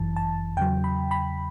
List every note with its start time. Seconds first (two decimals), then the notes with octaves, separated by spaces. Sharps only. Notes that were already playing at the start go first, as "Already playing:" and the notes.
Already playing: G1 F#2 E3 A5
0.16 A5
0.57 E2 C#3 F#3 G5
0.84 B5
1.11 B5